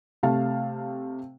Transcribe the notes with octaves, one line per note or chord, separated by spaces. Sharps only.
C3 A3 F5 A5